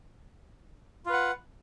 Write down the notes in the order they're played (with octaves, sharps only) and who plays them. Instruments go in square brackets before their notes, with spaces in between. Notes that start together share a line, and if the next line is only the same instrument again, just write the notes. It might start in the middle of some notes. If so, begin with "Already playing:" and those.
[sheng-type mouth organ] F4
B4
F#5